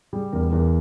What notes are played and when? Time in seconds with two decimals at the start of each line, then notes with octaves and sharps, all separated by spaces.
0.13 G3 G#4
0.32 E2 A#4
0.51 E2 A#4